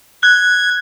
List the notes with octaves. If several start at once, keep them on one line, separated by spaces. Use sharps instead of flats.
F#6 G#6